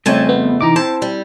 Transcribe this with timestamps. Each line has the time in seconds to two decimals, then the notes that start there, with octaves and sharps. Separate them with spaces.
0.06 F2 C#3 G3 A3 C4 C#5 G#5 A5
0.29 B3
0.61 C3 E3 D#4 A#5 D6
0.76 C4 E4 C5 A5
1.02 G3